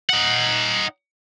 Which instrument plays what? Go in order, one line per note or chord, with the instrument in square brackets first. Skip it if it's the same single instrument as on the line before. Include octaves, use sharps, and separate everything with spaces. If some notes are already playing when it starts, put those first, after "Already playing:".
[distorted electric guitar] D#4 F#5